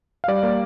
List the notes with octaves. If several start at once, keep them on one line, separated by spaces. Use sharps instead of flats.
F5
G3 D5
A#3